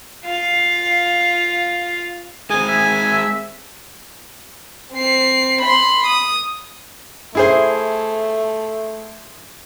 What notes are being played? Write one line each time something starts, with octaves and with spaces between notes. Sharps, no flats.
F4 F5
G#3 C4 G#5 D#6
E5
C4 C7
B5 C6
D#6
A3 E4 G#4 C5